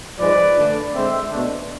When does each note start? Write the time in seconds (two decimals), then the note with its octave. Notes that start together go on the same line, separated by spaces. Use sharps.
0.19 G#2 F3 G#3 B4 D5
0.57 D3 A3 D4
0.94 D3 G#3 C4 C5 E5
1.31 B2 A3 D4